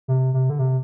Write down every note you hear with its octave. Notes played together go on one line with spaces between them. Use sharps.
C3
C3
D3
C3